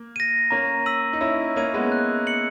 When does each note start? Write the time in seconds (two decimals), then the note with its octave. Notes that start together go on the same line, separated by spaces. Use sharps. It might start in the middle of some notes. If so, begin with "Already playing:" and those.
Already playing: A#3
0.16 A#6 D#7
0.51 A#3 C#4 A#5
0.86 E6 B6 D#7 F#7
1.13 D#4
1.21 C#4 E4 E6
1.56 A#3 C#4 G#6 D#7
1.74 G#3 B3
1.92 F#6
2.27 C#7 F#7